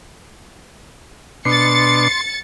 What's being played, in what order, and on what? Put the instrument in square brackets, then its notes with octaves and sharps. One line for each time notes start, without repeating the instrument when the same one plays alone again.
[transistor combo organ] B2 D4 [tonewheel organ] C6 [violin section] A6 C#7